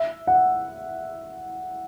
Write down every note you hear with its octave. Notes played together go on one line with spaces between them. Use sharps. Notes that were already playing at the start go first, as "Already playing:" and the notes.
Already playing: E5
F#5